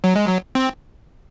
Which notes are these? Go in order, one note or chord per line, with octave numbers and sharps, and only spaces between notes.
F#3
G#3
F#3
C4